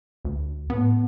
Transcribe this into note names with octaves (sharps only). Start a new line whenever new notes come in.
D2
A2 B3